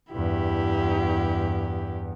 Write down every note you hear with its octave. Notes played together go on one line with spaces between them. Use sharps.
E2 G2 E4 G4